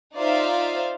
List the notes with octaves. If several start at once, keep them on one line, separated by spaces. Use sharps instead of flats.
D#4 F4 C5 D5 E5 F5